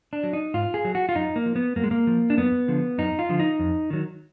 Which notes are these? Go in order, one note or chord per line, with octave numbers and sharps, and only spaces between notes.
D4
F#3
D#4
G#2 F4
G#4
F#3
F#4
F4
F#2 D#4
A#3
F3
B3
F#2 A#3
G#3
A#3
F3
D4
F#2 B3
D3 F3
F#2 D#4
F4
D3 F3
D#4
F2
D#3 F#3